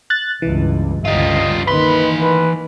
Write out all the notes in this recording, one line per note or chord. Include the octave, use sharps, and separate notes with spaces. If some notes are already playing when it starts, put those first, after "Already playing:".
F#6 A6
C#2 G2 E3
G1 C#2 G3 F4 D#5
D#3 E3 A#3 B4 B5 C6
B4